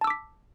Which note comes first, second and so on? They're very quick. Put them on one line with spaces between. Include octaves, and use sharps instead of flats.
A5 E6 D6 B6